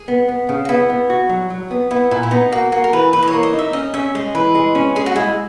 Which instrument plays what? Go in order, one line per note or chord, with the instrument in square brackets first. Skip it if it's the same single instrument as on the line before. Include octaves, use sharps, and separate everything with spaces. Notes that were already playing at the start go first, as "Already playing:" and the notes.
Already playing: [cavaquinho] G#4
[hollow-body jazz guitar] B3
B3
C#3
[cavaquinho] F#4
[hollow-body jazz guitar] B3 [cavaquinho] E4
[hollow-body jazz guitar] B3
F#4
F#3
F#3
B3
[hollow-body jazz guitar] B3 [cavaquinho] E4
[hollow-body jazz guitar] A#2 [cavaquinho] E4
[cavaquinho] E4
[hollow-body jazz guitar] B3 [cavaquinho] D#4
[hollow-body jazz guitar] A#3 [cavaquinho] F#4
[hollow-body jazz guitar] A#3 [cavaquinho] F#4
[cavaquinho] A#4
[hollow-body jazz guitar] E3 [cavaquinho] B4
[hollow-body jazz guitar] E3 [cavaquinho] B4
[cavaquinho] D#5
C#5
[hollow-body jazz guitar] A#3
[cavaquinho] D#5
[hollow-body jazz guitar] D#4 [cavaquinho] E5
[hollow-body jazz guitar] C#4 [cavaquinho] D#5
[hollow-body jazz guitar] C#4 [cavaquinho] E5
[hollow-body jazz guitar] G#3 [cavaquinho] D#5
[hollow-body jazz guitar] E3 [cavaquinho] B4
[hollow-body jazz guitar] G#3
C#4
[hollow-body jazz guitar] C#4 [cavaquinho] G#4
[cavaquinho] F#4
[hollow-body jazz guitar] G#3 [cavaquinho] E4